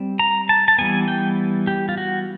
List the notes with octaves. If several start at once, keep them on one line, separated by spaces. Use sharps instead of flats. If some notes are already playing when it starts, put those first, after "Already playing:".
Already playing: G3 C4
A#5
A5
A5
E3 G3 B3 G#5
G5
G4
F4
F#4